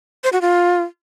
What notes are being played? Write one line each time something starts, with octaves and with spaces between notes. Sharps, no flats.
C5
F#4
F4